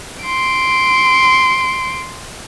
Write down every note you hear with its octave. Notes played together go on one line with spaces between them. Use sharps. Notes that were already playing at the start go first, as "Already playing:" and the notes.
C6 D7